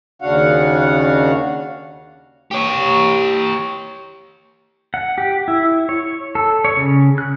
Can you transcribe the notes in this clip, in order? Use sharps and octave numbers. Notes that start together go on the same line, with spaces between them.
D#2 C#3 D4 F#4 F5 F#5
G4 C#5
F#5
G4
E4
C#5
A4
C#5
C#3
F#6